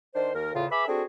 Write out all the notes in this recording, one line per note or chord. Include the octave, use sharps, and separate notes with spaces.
D#3 D4 C5
D#2 A#4
E2 A2 C#3 F4 F5
G#4 B4 E5 B5 D6
C4 D4 F#4 G#4 A4